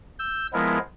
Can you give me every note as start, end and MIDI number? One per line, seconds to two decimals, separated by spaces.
0.19 0.47 88
0.19 0.47 91
0.53 0.78 53
0.53 0.78 56
0.53 0.78 59
0.53 0.78 64
0.53 0.78 70